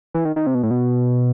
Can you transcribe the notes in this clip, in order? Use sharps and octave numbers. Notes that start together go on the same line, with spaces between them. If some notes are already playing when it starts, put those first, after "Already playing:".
E3
D#3
D#3
C3
B2
A2
B2